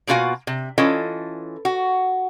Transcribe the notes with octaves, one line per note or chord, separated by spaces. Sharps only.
B2 A#3 F4 F#4 F5 G#5
C3
E3 C#4 F4 A4 D#5
F#4